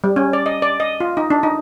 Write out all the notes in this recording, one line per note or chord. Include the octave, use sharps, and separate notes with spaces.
G3
C#4
D5
D#5
D5
D#5
F4
D#4
D4
D#4